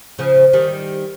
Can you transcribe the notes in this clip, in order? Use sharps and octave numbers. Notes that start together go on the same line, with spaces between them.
C#3 F3
D#3 G3